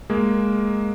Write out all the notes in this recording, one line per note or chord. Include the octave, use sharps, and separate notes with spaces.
G#3 A#3